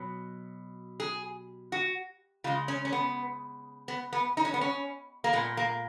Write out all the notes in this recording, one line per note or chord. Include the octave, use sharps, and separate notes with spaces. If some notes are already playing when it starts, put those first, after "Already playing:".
Already playing: B2 F#3
G#4
F#4
C#3 G#3 F4
C#4
C#4
B3
B3
B3
D#4
C#4
B3
C#4
A#3
A#2 G#3 B3
A#3